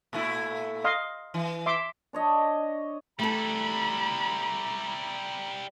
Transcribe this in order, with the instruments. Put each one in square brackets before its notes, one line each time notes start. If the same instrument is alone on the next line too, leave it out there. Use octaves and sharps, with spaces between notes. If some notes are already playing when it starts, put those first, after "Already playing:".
[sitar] A#2 A3 E4
[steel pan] D#5 F5 C6
[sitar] E3
[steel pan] E5 C6 D6
[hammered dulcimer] D4 C#5 D#5
[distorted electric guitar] G3 E4 [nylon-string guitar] A3 A4 [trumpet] A#5 [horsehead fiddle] B5